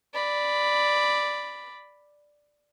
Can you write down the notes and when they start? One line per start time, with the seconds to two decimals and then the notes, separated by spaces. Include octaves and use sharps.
0.14 D5 B5